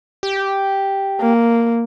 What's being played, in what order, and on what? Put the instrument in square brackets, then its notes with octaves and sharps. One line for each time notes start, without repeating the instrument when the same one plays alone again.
[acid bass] G4
[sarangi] A#3